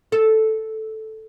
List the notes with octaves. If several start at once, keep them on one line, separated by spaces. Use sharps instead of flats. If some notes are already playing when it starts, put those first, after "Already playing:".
A4